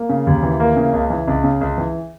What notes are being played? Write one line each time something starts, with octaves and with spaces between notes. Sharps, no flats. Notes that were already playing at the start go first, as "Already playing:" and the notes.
Already playing: A#3
C#3
D#2
E3
A#3
C#3
C#2
E3
C#2
C#3
C#2
E3